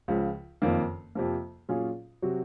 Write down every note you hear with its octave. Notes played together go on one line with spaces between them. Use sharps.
C#2 C#3 F3
F#1 F2 D#3 A#3
F2 C3 F3 A#3
A#2 F#3 C#4 F4 G#4
C3 F#3 C4 F#4